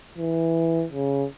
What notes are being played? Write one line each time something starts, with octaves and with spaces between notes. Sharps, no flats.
E3
C#3